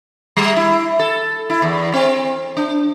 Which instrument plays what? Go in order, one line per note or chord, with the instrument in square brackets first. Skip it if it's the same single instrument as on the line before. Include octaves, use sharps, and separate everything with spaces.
[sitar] G3
E4
A4
E4
E2
C4
D4